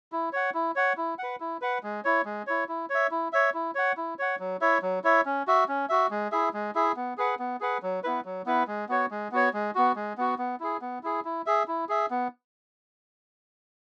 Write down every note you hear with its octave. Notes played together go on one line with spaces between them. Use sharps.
E4
C#5 F#5
E4
C#5 F#5
E4
B4 F#5
E4
B4 F#5
G#3
E4 C#5
G#3
E4 C#5
E4
C#5 E5
E4
C#5 E5
E4
C#5 F#5
E4
C#5 F#5
F#3
E4 C#5 E5
F#3
E4 C#5 E5
C#4
F#4 E5
C#4
F#4 E5
G#3
E4 G#4 E5
G#3
E4 G#4 E5
B3
G#4 B4 F#5
B3
G#4 B4 F#5
F#3
B3 E4 B4
F#3
B3 E4 B4
G#3
B3 F#4 C#5
G#3
B3 F#4 C#5
G#3
B3 F#4
G#3
B3 F#4
B3
E4 G#4
B3
E4 G#4
E4
G#4 E5
E4
G#4 E5
B3